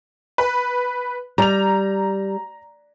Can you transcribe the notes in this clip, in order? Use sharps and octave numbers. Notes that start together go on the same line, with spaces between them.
B4
G3 A#5 F7